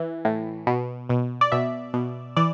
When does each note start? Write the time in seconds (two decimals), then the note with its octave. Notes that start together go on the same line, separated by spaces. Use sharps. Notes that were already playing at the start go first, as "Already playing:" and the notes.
Already playing: E3
0.25 A2
0.67 B2
1.09 B2
1.41 D5
1.52 B2 E5
1.94 B2
2.37 E3 D5